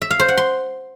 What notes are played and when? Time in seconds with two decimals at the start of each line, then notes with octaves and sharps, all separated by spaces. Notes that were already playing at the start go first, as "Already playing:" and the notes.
0.02 E5
0.11 F5
0.19 C5
0.28 F#5
0.37 C6